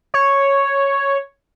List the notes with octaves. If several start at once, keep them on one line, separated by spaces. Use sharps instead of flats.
C#5